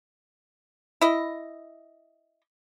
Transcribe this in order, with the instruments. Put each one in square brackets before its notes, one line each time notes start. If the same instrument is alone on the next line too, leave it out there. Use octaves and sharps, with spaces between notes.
[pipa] E4 D#5